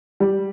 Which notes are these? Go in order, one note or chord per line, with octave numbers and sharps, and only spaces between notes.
G3